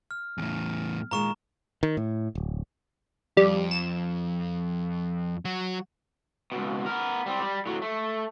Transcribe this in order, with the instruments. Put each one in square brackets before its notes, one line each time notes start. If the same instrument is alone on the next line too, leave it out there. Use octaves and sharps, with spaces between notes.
[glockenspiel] F6
[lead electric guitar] E2 A2
[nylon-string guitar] A#2 D#3 G#3 [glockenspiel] A#5 C#6 E7
[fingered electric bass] D#3
A2
D1
[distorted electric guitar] F2 [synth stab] G3
[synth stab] E7
[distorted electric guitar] F#3 F#4
[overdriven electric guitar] C#2 B2
B3 A#4
G3 C4
G3
A2 F#3
A3